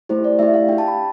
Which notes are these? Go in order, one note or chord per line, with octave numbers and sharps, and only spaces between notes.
A3 E4 G4 C5
D5
A3 E4 G4 E5
F5
D4 G4 G5
A5
B5